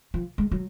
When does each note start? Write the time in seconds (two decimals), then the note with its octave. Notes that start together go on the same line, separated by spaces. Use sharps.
0.14 F3
0.38 G#3
0.51 F#3